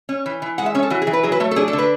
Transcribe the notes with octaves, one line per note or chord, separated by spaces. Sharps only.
C#4
E3
E3
G#3 F#5
E5
C#4 C#5
A4
E3 F#4
G#4
E3
B4
F#3 G#4
B4
A3 C#5
A4
D4 G#4
A4
D3
B4